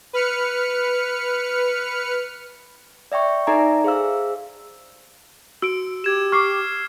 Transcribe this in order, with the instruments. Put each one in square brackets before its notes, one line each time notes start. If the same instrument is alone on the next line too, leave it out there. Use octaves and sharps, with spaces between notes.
[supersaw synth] B4 F6 C#7
[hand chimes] D5 E5 G5 C#6
D#4 A4 D5 E5 G#5 A#5
G#4 C5 F5 E6
[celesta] F#4 D7 [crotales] E6
[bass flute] G4 [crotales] G#6 E7
[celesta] C#6 D6 [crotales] F6 C7